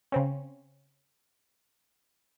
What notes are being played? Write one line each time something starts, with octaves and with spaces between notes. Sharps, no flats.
C#3 C4 C#4